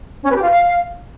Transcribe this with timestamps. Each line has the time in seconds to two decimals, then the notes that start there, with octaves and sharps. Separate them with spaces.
0.24 C#4
0.30 B4
0.36 G4
0.42 F4
0.49 F5